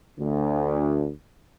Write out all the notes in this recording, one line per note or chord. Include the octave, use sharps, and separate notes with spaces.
D2